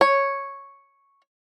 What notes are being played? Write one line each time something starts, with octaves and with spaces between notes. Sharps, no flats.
C#5